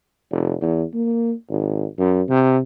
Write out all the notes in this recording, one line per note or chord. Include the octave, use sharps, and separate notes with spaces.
F1
E2
A#3
G#1
F#2
C3